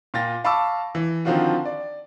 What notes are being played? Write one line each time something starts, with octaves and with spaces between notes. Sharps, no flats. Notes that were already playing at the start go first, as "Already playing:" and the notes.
A#2 F4 G5 A6 A#6
F5 A5 B5 C#6 D6 E6
E3
D3 D#3 F3 C4 F4 F#4
D5